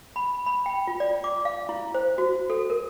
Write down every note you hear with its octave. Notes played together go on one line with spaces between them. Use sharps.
B5
B5
G5
F4
D5
D6
F5
E4
C5
F#4
A4
A#4